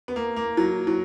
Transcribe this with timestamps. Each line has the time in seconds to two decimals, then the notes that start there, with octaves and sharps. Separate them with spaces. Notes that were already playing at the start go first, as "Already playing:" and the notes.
0.08 B3
0.16 A#3
0.36 A#3
0.57 F#3
0.87 F#3